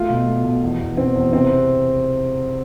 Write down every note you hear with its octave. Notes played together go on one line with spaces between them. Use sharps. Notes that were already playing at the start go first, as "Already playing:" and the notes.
Already playing: A3 F4
B2
A3
B2
E2
E2
B2 C4
E2
C3 C4